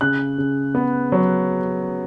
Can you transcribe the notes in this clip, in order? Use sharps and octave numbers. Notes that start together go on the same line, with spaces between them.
C#3 F#6
C#3
B3
F#3